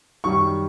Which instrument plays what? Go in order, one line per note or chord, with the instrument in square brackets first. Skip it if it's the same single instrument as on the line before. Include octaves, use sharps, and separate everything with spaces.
[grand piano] F#2 D#3 G3 C#6